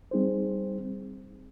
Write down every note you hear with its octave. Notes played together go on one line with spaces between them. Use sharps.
G3 C4 D#4 G#4 C5